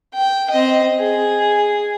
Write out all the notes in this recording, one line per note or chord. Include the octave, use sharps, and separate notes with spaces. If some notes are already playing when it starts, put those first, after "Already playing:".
G5
C4 D#5
G#4